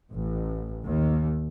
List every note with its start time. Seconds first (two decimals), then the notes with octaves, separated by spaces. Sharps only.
0.12 A1
0.84 D#2